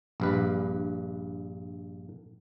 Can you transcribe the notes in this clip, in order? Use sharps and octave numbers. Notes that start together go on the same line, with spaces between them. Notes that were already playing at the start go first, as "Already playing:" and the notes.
A#1 G2 B4